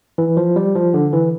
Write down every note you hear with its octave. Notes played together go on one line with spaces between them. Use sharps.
E3
F3
G3
F3
D3
E3